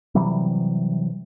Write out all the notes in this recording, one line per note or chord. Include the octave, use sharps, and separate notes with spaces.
C3 E3 F#3 G3